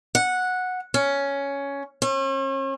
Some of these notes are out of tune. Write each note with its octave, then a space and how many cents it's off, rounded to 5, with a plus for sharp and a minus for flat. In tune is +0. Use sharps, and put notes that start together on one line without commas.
F#5 -10
C#4 +10
C#4 -40